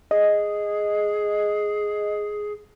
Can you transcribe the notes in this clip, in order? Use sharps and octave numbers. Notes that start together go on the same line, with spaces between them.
G#4 D#5